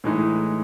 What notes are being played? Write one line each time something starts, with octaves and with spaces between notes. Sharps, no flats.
A2 E3 G#3 D#4